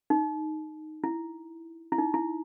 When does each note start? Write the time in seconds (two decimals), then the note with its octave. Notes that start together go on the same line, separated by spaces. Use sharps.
0.10 D#4
1.04 E4
1.92 E4
1.98 D#4
2.14 E4